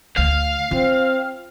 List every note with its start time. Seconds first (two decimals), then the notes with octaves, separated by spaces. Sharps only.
0.18 D2 F5
0.71 C4 F4